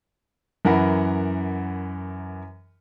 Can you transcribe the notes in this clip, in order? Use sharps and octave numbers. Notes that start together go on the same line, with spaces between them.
F#2 E3 A#4 F#5 B5